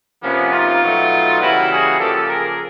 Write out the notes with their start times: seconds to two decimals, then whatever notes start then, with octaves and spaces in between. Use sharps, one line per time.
0.22 C3 F3 A#3 B3 C#4
0.51 D#4 F4
0.81 B2 F#3 A3
1.40 C#3 E3 G3 A#3 E4 F#4
1.69 F#4 G#4
1.98 C#3 F3 A#3 G4 A4
2.28 G#4 A#4